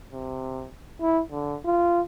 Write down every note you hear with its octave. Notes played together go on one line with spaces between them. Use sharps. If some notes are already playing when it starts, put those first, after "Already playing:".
C3
E4
D3
F4